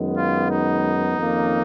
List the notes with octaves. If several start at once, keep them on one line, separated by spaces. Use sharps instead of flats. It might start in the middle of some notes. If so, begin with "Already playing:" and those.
Already playing: F#2 D#3 G#3 B3
F4
D#4
F2 D#3 A#3 C#4